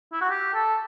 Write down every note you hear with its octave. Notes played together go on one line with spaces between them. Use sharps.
E4
F#4
G4
A4